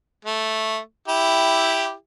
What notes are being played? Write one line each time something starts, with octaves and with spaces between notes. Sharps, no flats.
A3
E4 G4